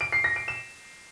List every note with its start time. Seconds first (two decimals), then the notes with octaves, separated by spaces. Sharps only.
0.01 D7
0.12 C7
0.24 A#6
0.36 D7
0.48 E7